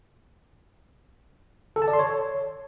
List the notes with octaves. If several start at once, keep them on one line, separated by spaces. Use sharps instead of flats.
A4
A5
D5
C6
C#5